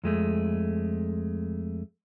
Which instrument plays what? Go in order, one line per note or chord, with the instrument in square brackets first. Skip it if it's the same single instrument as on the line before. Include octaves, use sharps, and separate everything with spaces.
[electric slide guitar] F2 G#3 A3